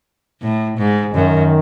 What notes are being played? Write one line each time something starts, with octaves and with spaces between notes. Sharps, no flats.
A2
G#2
F#2 D#3